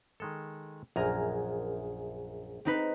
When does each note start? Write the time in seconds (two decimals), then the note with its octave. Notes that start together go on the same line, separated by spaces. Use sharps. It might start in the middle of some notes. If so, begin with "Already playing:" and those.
0.20 D#3 G#3 A4
0.96 A#1 F#2 G#4 A#4
2.65 C4 D#4 B4